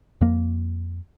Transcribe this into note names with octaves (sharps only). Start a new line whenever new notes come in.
F2 A#3